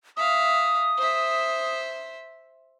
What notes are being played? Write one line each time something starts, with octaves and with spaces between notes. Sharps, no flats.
E5 F5 D#6
C5 E5